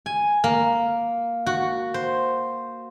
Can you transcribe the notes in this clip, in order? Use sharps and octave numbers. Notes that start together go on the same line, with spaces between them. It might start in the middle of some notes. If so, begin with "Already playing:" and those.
G#5
A#3
F#4
C5